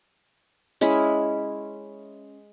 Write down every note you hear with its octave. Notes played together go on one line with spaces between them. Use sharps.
G#3 C#4 E4 B5